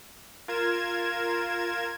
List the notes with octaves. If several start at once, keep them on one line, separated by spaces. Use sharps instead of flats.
F4 A#4 G#6 E7